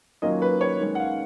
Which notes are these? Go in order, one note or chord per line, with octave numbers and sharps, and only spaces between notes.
D#3 F#3 A#3 C#4 F4 D#5
B4
C#5
D#3 G#3 C#4
F#5
F5